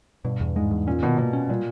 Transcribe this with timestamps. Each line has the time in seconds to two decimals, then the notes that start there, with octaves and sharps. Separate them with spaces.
0.25 G2 B2
0.40 E2
0.56 G#2 G#3
0.71 E2
0.87 A#2 C#4
1.03 B2 D#3
1.18 B2 A#3
1.33 C#4
1.49 A#2 G3